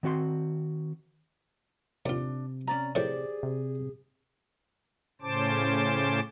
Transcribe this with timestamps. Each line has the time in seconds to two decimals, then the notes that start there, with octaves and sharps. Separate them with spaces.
0.03 D#3 C4 F#4 F5 C6
2.06 D#2 C3 D4 F4
2.67 C#4 D5 A#5
2.95 A2 E3 G4 G#4 C5 D5
3.43 C3
5.22 A2 C#3 C#4 C5 A5 D6